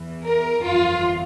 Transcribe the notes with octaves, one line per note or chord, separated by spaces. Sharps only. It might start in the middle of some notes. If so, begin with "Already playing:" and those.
Already playing: E2 E3
A#4
G1 F2 E3 F4